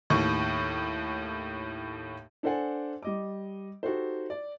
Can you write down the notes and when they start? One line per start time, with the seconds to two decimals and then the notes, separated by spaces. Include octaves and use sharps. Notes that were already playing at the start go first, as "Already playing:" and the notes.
0.10 D#2 A2 C#6
2.43 D4 A4 C5 D5 F#5 G#5
3.03 G3 D#5 D6
3.83 D#4 F#4 G4 A4 C5
4.30 D5